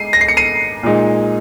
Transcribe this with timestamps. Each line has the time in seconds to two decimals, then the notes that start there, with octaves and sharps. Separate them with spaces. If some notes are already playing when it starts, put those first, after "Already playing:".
Already playing: G#3 C7 D#7
0.13 A#6
0.21 C7
0.28 C#7
0.37 C7 D#7
0.83 A#2 G#3 D#4